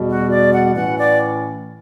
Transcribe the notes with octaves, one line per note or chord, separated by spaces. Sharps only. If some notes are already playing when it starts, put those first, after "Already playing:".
Already playing: E2 B2 G3
F#4
D5
F#5
A2 E3 A3 C#4 F#5
D5